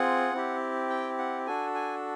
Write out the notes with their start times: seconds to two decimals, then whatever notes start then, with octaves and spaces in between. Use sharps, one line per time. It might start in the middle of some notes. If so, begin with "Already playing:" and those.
Already playing: C4 F4 G#4 F#5
0.33 C4 E4 G4
0.90 G5
1.18 F#5
1.46 D4 F#4 A4 G#5
1.75 G#5